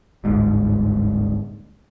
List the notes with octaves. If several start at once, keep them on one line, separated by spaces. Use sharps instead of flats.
D1 G1 G#2